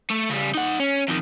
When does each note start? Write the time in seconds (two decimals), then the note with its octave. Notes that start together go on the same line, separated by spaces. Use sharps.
0.10 A3
0.30 C#3 G3
0.55 D#4 F#5
0.80 C#4
1.08 F2 D#3